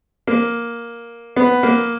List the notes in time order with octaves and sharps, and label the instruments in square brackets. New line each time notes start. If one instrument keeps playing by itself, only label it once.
[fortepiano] A#3
B3
A#3